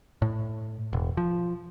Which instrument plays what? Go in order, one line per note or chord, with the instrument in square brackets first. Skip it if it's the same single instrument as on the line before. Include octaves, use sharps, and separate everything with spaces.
[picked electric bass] A2
E1
F3